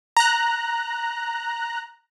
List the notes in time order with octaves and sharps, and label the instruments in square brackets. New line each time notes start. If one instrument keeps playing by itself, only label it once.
[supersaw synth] A#5 F#6